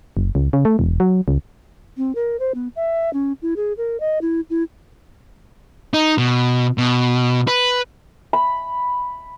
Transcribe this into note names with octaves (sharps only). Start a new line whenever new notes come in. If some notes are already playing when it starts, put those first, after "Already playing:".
F#1
C#2
C#3
A3
E1
F#3
C#2
C4
A#4
C5
B3
E5
C#4
E4
G#4
A#4
D#5
E4
E4
D#4
B2
B2
B4
B5